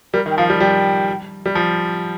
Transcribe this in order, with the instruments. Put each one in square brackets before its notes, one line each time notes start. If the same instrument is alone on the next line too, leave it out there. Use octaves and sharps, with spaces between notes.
[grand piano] G3 [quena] A#4
[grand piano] D#3
[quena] G5
[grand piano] F3 [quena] F5
[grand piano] G3
[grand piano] G3 [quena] G5
[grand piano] G3
F3